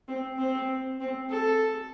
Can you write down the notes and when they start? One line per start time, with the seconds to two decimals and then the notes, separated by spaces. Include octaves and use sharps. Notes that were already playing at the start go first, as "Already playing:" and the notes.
0.08 C4
0.38 C4
1.00 C4
1.29 A4